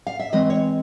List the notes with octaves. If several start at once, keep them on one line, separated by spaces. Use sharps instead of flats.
F5
E5
E3 G#3 C4 D#5
C#5